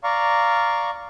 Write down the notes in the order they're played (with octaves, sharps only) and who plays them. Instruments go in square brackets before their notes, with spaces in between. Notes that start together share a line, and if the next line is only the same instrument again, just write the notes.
[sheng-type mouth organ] D5 F5 A#5 C#6